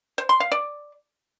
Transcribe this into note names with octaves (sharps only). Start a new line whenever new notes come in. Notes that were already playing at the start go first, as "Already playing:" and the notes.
C5
C6
F5
D5